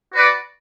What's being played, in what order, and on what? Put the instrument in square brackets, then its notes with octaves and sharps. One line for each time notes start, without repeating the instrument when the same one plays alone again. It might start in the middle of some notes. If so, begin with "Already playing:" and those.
[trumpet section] F#4 B4 D5 F#5